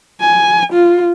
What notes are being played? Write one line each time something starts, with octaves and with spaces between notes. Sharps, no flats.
G#5
F4